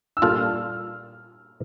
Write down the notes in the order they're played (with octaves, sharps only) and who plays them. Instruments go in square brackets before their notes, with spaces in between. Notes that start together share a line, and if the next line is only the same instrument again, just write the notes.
[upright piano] E6
[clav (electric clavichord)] A#2 G3 D4 F4 A4 [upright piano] F6